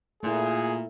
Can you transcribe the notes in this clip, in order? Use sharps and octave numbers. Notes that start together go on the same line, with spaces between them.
A#2 A3 E4 G#4